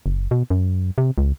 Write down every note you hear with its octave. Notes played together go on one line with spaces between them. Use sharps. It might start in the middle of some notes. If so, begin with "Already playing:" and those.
F#1
B2
F#2
C3
C#2